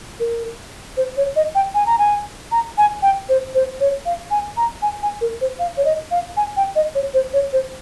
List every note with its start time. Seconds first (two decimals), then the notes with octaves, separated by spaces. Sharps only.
0.20 A#4
0.97 C5
1.17 C#5
1.36 D#5
1.55 G5
1.74 G#5
1.86 A#5
1.98 G#5
2.52 A#5
2.78 G#5
3.02 G5
3.29 C5
3.55 C5
3.80 C#5
4.06 F5
4.31 G#5
4.57 A#5
4.82 G#5
5.03 G#5
5.21 A#4
5.41 C5
5.59 F5
5.77 C#5
5.85 D#5
6.11 F5
6.37 G#5
6.57 G5
6.76 D#5
6.95 C#5
7.14 C5
7.33 C#5
7.53 C5